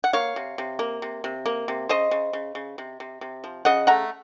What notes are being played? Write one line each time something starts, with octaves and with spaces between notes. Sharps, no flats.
F#5
A#3 C#5 F5
C3
C3
A#3
C3
C3
A#3
C3
C#3 C5 D#5
C#3
C#3
C#3
C3
C3
C3
F3
C#3 D#5 F#5
A3 F#5 A#5